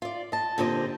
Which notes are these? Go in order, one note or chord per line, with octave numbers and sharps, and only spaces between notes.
F4 D5
D#5 A5
A#2 D3 C4 G4 D#5